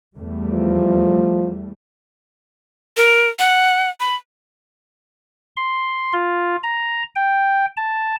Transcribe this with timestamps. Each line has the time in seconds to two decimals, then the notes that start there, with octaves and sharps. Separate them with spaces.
0.16 E2 G3 A3
0.52 F3
2.97 A#4
3.39 F#5
4.00 B5
5.57 C6
6.13 F4
6.63 A#5
7.15 G5
7.77 A5